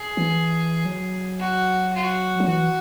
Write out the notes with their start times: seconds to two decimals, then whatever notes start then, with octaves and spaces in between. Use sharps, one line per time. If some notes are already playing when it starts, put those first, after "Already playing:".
Already playing: G#4
0.17 E3
0.85 F#3
1.39 F#4
1.93 F#4
2.40 F#3
2.48 E3 F#4